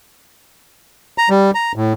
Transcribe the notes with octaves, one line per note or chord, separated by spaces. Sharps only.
A#5
G3
A#5
A2